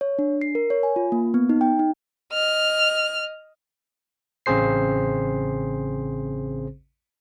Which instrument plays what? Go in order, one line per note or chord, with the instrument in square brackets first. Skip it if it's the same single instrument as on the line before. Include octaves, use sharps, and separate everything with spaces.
[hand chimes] C#5
D4
C7
A#4
C#5
G#5
F4
A#3
B3
D#4
G5
D#4
[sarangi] D#5 [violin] F6
[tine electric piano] A1 C#3 C4 G#4 C5 C7